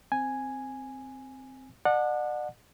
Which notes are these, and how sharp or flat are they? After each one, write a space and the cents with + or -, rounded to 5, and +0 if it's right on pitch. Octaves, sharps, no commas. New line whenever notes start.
C4 +0 G#5 +0
D5 +40 F#5 -20 A5 +0